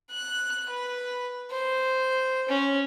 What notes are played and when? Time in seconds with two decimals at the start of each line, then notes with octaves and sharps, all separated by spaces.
0.11 F#6
0.69 B4
1.51 C5
2.49 C#4